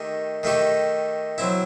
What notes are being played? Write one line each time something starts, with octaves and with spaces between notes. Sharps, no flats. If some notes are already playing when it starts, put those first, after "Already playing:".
Already playing: D#3 A3 D#4 G4
D#3 A3 D#4 G4
F#3 C4 E4